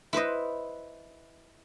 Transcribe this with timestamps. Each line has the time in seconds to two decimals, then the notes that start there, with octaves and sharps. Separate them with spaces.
0.13 E4 B4 C5 D#5